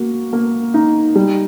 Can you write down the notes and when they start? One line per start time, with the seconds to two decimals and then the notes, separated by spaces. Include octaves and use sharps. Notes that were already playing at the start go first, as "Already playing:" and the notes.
Already playing: A#3 F#4
0.33 A#3
0.74 D#4
1.15 G3